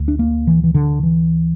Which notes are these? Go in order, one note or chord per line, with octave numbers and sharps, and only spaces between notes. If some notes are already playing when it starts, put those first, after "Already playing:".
Already playing: D2
D4
A#3
E3
E3
D3
E3